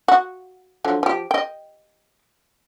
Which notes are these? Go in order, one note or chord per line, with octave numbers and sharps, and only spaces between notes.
F#4
D3 F3 F#3
F3 G4
D#5 G5